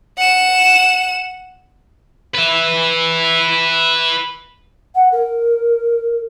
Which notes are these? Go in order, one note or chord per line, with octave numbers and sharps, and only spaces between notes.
F#5 E7
B4 E5
F#5
A#4